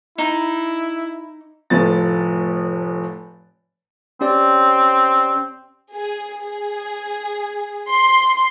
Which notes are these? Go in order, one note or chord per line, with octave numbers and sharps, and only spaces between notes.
D#4 E4
F1 A2 F3 A6
C4 C#4 G4 D5
G#4
G#4
C6